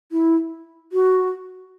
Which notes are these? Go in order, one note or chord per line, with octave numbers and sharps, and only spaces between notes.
E4
F#4